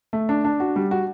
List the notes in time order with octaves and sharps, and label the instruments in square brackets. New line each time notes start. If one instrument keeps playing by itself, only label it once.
[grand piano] A3
D4
D4
F#4
G3
F#4